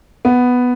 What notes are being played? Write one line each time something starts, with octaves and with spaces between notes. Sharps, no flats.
B3